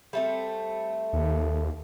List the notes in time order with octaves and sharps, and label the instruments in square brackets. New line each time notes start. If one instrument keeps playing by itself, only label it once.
[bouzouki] G3 A3 C4
[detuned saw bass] D#2